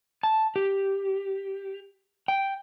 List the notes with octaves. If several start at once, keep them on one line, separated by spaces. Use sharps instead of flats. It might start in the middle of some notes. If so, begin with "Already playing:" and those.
A5
G4
G5